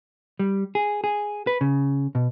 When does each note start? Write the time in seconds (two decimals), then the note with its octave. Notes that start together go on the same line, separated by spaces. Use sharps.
0.39 G3
0.75 G#4
1.04 G#4
1.47 B4
1.61 C#3
2.15 B2